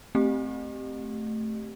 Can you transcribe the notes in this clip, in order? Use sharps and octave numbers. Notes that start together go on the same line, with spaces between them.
A3 C4 G4